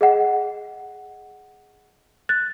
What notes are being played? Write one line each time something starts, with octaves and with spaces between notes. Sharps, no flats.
G#4 D#5 F#5
F#6 A6